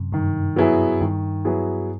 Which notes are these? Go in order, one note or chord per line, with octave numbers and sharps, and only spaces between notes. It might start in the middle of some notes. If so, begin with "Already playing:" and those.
Already playing: F#2 C3
G2 D#3
F#3 B3 E4 G#4
G2 D#3
F#3 B3 E4 G#4